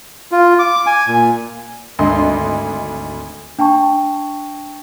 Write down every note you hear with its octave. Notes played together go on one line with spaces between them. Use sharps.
F4
D6
G#5
A#2
G#1 D2 D#5 C6
D4 G5 A5 C#6